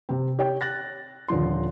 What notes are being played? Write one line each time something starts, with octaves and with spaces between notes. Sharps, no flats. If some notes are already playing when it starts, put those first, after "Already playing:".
C3 C4
G4 C#5 G5
F#6 A6 A#6
D#1 D3 F3 C6